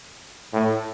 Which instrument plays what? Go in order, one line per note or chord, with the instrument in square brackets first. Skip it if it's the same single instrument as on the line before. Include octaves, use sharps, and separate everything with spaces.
[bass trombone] A2